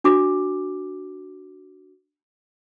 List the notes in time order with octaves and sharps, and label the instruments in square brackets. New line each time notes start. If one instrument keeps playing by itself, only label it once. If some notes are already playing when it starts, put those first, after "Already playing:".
[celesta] D4 F#4 D6